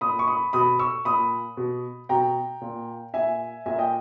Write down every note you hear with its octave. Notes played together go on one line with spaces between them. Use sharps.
A#2 B5 D#6
C#6
B5 D#6
B2 B5 D#6
C#6 E6
A#2 B5 D#6
B2
B2 G5 A#5
A#2
A#2 E5 G#5
A#2 E5 G#5
D#5 G5